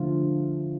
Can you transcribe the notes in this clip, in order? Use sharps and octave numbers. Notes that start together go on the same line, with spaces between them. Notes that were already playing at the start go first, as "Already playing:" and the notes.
Already playing: D3 F3 A3 F4